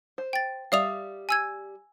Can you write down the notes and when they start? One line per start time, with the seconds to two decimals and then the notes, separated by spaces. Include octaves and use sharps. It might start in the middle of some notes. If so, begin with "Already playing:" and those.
0.18 C5
0.33 G5 A6
0.72 G3 D5 E5 F5 D#6 F7
1.29 G#5 E6 G#6